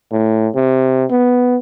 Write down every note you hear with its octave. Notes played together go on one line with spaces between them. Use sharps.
A2
C3
B3